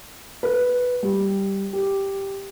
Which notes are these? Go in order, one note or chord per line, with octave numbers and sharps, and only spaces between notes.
B4
G3
G4